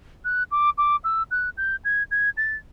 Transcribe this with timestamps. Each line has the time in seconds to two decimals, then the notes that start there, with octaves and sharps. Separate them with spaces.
0.25 F#6
0.52 D6
0.78 D6
1.04 E6
1.31 F#6
1.57 G6
1.85 G#6
2.11 G#6
2.37 A6